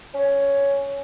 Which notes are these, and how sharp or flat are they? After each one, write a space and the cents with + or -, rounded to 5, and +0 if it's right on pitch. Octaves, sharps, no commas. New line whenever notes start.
C#4 +5